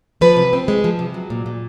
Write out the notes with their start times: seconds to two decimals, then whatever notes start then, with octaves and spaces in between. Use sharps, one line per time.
0.21 F3 B4
0.37 C3
0.53 C4
0.68 G#3
0.84 F3
0.99 C3
1.14 F#3
1.30 A#2
1.46 A#2